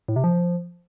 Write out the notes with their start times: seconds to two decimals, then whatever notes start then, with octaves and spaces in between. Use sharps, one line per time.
0.08 A2
0.16 C3
0.24 F3